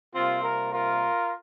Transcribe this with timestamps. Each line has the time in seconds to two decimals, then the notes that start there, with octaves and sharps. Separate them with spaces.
0.13 C3 G3 A#3 C4 F4
0.42 F4 A#4
0.71 F4 A#4